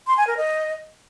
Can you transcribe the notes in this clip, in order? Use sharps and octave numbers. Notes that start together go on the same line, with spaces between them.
C6
G#5
A#4
D#5